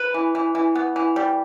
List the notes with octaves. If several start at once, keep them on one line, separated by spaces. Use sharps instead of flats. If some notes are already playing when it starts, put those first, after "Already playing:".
Already playing: B4
E3
E3
E3
B3
E3
G3